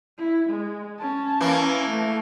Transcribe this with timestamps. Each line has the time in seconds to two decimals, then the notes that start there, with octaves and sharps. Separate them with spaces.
0.18 E4
0.49 G#3
0.99 C#4 A5
1.41 E3 A#3
1.88 A3